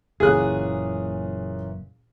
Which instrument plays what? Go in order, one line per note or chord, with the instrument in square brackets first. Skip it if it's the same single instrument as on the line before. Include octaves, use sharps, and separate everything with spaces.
[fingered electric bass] F#1 C#3 [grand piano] A#2 E3 C#4 [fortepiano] G#4 F#6